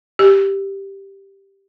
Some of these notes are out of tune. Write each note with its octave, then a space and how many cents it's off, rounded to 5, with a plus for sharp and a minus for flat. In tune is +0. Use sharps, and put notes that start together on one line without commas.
G4 +0